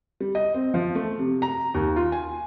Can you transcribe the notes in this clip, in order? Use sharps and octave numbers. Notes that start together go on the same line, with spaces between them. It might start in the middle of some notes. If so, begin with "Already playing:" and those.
G3
D#5
C4
F3
A3
C3
A#5
D#2
F4
G#5